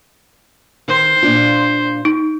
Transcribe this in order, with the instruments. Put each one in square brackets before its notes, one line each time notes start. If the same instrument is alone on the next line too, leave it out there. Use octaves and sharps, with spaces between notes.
[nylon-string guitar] D#3 [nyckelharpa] C5
[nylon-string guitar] A#2 D4 F4
[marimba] D#4